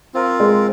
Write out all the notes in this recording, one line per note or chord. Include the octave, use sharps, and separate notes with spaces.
C4 F4 A#4
G#3